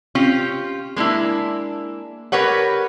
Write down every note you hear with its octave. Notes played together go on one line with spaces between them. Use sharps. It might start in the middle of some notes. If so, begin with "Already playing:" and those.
C4 C#4 F4 G4
G#3 A#3 D4 E4
G4 A#4 B4 C#5 F#5